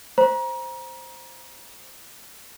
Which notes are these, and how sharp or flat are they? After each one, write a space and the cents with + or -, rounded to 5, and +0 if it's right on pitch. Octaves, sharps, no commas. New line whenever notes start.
C5 +0 A#5 +30